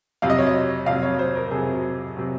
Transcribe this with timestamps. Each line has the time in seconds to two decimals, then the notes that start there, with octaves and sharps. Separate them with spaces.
0.22 F2 C3 F#3 F5
0.30 D#5
0.39 C#5
0.47 D#5
0.86 F2 C3 F#3 F5
1.03 C#5
1.19 C5
1.36 A#4
1.51 F2 C3 F#3 G#4
2.17 C3 F#3